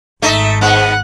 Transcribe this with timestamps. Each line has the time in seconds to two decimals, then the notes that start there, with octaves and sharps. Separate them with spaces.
0.22 G#1 A3 D#4 D#5 E5
0.61 G#2 B3 F#5